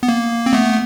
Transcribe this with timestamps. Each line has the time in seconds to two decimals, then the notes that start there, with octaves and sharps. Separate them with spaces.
0.03 B3
0.09 A#3
0.46 C4
0.53 A3 B3